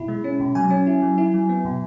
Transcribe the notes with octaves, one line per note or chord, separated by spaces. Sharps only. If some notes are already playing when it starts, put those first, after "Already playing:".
Already playing: B2 E4 B5
G#3
C#4
B2
F#3 G#5
C#4
E4
F#3
E4
F#3
B3
B2